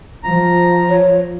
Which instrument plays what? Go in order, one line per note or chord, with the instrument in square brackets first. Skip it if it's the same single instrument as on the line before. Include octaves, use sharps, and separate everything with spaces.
[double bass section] F3 [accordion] A#5
[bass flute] C#5